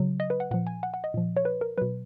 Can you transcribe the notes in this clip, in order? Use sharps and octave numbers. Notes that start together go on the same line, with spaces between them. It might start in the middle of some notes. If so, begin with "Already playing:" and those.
Already playing: C#3 F#3
D#5
B4
F#5
A#2 F3 F#5
G#5
F#5
F#5
D#5
A#2 F3
C#5
B4
A#4
B2 F#3 B4